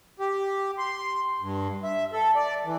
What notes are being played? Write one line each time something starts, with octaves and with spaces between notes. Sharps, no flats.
G4
C6
G2
E5
A4
D5
E3